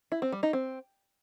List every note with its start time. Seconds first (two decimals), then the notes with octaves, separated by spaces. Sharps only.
0.12 E4
0.22 C4
0.32 G3
0.43 D#4
0.53 C4